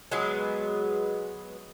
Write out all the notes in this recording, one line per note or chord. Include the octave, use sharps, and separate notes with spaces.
F#3 G#3 B3 G#4